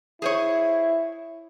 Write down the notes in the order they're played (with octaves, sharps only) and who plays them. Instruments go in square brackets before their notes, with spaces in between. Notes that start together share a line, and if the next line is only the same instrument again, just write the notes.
[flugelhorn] E4 [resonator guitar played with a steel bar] G#4 C5 C#5